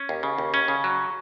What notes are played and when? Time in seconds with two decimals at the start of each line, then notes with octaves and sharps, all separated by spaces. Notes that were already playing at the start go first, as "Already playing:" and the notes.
Already playing: C#4
0.09 D#2
0.23 C#3
0.38 D#2
0.54 C#4
0.68 C#3
0.84 F#3